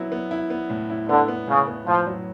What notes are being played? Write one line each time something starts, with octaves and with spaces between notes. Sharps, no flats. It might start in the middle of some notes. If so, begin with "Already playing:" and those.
Already playing: F#3 B3 E4
B3
E4
B3
A2
E4
D3 B3
B3
A2 C#3
B3
A2 F3
F#3